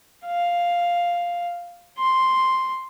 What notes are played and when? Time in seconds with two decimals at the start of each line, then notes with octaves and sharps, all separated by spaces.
0.25 F5
1.98 C6